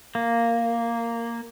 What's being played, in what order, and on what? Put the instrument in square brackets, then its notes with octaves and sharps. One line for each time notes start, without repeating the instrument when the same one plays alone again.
[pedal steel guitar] A#3